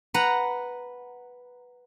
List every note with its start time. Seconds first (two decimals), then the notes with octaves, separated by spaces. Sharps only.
0.14 B4 F#5 A#5